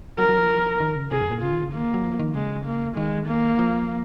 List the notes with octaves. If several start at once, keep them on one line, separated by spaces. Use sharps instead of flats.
F#3 A#4
F#3
F3
D#3
C#3
C3 G#4
F#2
A#2
C#3 F4
D#3
C#3
D#3 A#3
F#3
F3
D#3
C#3 G#3
A#3
D#3 G#3
A#3
F3